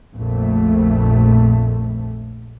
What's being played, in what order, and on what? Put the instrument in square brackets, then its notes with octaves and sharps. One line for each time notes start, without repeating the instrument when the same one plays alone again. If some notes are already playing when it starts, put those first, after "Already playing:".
[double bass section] A#1 F2 A#2 A3